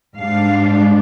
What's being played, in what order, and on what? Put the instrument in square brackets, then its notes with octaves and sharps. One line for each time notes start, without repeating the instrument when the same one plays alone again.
[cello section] G#2 G3 D4 F5